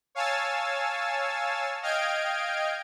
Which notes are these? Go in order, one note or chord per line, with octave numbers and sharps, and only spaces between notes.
C#5 F5 G#5 A5 E6 A6
D#5 F5 G5 F6 G#6 D7